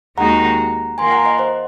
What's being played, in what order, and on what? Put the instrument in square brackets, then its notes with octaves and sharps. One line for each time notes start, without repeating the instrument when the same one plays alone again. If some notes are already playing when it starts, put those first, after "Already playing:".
[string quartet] D#2 D#3 G#3 D#4 F#4 [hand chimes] F#5 A#5
[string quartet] D#3 A#3 F4 [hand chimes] G#5 C6
[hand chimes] F#5 A#5
D#5 F#5
C5 D#5